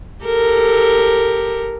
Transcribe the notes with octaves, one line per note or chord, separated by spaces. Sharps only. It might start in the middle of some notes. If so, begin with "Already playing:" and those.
G4 A4 A#4